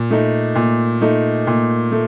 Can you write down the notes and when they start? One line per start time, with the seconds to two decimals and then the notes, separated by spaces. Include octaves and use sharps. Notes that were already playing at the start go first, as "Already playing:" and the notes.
Already playing: A#2
0.11 A3 D#4
0.55 A#2
1.01 A3 D#4
1.47 A#2
1.92 A3